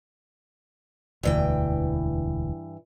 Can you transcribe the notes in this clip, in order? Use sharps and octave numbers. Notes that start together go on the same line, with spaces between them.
E1 D2 G2 E3 G5